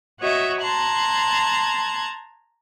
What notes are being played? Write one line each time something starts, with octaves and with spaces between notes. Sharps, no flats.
F#4 C#5 D#5 E5
A5 A#5 C6 F#6 G#6